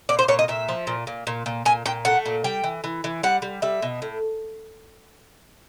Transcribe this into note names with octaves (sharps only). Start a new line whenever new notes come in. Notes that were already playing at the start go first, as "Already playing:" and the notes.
A#2 D5
C5
A#2 C#5
D#5
A#2 E5
F3
A#2
A#2
A#2
A#2
A#2 G#5
A#2 G5
A3 F#5
A#2
G3 G5
E3
E3
E3
G3 F#5
G3
G3 E5
B2
A2